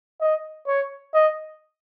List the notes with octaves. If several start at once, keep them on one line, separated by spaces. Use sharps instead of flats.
D#5
C#5
D#5